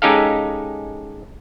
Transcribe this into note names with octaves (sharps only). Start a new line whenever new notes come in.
G#3 C#4 D#4 G4 A4 F5